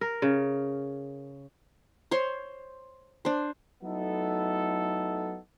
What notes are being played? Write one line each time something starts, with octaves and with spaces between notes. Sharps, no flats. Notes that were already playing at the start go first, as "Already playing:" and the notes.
A#4
C#3
C5 C#5 C6
D4 C5
F#3 A3 B3 D#4 E4 A4